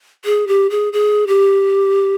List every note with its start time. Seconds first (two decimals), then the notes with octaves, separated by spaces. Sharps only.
0.25 G#4
0.47 G4
0.70 G#4
0.93 G#4
1.27 G4